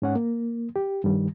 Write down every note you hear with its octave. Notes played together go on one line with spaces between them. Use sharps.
G#2 C#4 F#5
A#3
G4
G2 D#3 G3